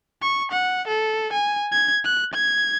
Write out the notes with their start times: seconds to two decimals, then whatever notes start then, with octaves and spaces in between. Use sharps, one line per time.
0.22 C#6
0.52 F#5
0.88 A4
1.33 G#5
1.72 G#6
2.05 F#6
2.34 G#6